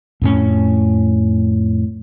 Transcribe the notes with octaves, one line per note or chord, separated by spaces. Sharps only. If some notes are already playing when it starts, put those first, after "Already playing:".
F2 A2 C#4